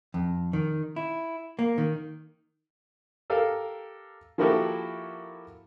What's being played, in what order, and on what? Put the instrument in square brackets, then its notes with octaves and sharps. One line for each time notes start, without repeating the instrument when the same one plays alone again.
[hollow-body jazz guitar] F2
D#3
E4
A#3
D#3
[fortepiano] G4 A4 A#4 F5
F3 A#3 E4 F#4 G4 A4